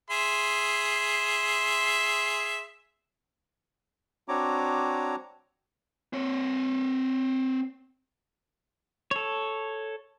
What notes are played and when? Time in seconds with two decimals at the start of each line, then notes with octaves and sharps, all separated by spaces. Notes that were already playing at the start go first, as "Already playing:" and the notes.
0.10 G#4 E5 C6
4.28 C4 D4 F#4 C#5 A#5 D6
6.13 C4 C#5
9.11 A4 C#5